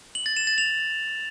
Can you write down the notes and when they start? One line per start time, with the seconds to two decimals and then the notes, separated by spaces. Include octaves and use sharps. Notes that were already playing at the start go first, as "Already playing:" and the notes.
0.15 F#7
0.26 A6
0.37 E7
0.47 A6
0.58 F7